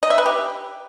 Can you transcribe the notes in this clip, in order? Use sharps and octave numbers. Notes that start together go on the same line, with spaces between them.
D#5
E5
B4
G4